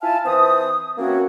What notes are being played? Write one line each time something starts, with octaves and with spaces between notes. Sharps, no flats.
E4 F4 F5 G#5 A5
E3 C4 C5 D#6
E3 A#3 C4 C#4 F#4